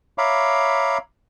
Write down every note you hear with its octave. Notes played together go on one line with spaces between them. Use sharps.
C#5 E5 F5 A#5 B5 D6